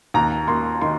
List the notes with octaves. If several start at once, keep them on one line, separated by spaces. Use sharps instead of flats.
D#2 A#5
A#3 C6
D#3 C6